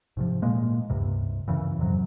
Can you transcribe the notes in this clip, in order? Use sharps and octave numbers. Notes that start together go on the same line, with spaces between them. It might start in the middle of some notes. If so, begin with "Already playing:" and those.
G#2 C3 F3
A#2 G#3 A#3
C#2 G2 C3
F#2 C#3 E3
F2 G#2 C3 F#3